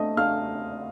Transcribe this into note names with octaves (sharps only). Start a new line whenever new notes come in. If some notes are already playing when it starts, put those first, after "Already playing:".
Already playing: A3 C4 D#5 D#6
A3 F5 F6